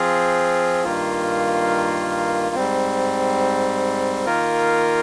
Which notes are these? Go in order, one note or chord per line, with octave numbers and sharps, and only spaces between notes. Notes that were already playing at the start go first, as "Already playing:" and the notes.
Already playing: F3 C4 F4 G#4
G2 D#3 A#3 F4
G#2 G3 C4
D#3 A#3 F4 A#4